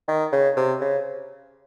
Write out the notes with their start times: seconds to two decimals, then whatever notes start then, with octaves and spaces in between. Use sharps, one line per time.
0.08 D#3
0.32 C#3
0.57 C3
0.80 C#3